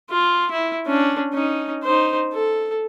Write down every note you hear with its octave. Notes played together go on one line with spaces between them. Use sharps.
F4
E4
C#4 D4
C#4 D#4
D#4 C5
A4